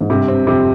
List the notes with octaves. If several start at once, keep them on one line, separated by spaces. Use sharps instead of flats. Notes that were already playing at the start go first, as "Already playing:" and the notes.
G#2
G2 C3
C4
F2 C3